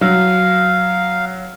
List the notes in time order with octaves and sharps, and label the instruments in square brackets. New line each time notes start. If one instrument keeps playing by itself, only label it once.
[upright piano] F#3 [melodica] F5